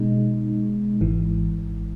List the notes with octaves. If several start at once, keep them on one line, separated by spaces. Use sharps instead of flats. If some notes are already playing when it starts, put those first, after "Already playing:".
Already playing: B2 G#3 D#4
G#1 G#2 E3